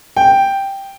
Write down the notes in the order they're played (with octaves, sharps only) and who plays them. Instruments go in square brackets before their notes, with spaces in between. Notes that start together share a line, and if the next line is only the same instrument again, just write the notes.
[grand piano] G5